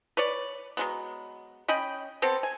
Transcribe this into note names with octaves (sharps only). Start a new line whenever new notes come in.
B4 C#5 D5
F#3 G#3 B3
C#4 D#5 G5 B5
B3 C4 A4
G#5